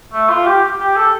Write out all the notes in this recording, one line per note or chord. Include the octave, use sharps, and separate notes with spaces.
A3
F4
G4
G4
A4